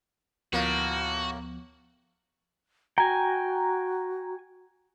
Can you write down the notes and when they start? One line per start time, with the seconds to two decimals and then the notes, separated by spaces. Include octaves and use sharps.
0.53 D2 A2 F3 A#3 B3 F#4
2.98 F#4 G5 G#5 A#5